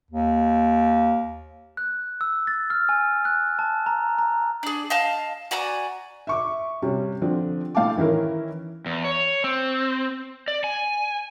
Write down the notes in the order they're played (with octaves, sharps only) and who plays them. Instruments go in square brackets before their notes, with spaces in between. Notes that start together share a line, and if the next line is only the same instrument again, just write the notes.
[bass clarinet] D#2
[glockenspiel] F#6
E6
A6
F6
G#5
F#6
A5
A#5
A#5
[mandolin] D4 G#4
D#5 F5 A5
F#4 D5 G#5 A#5
[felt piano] E5 C#6 D6
C3 G3 C#4
D3 F3 C4 D4
A2 F5 G5 A5 D6
D#3 E3 C#4 E4 A#4
[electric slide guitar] E2
C#5
C4
D5
G#5